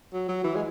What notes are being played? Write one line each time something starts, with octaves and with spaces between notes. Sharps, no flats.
F#3
F#3
E3
G#3